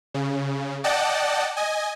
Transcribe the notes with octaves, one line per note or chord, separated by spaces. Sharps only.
C#3
D5 D#5 F#5 G5 A5
D#5 G#5